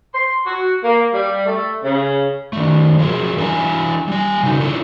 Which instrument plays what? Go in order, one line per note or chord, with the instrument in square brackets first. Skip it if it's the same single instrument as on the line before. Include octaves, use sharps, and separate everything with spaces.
[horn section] C6
F#4
A#3
G3
A3
C#3
[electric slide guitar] D#3 A3
F3 F#3 G#4 A#4
E3 D4 E4 E5 G#5 A#5
G3 G#5
C#3 F#3 D#4
D4 E4 F4 A4